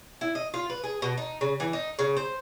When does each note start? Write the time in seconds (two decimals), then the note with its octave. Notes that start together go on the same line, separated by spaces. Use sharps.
0.21 E4
0.35 D#5
0.54 F4
0.70 B4
0.84 G#4
1.02 B2
1.18 D#4
1.41 C#3
1.60 E3
1.73 D#4
1.99 C#3
2.17 C5